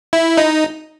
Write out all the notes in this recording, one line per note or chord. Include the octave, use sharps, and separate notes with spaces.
E4
D#4